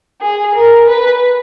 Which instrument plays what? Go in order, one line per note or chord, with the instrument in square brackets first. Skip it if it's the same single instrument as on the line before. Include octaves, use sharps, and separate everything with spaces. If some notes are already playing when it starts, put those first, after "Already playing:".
[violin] G#4
A#4
B4